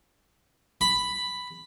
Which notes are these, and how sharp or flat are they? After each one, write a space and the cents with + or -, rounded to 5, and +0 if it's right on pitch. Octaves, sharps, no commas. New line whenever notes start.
B5 +5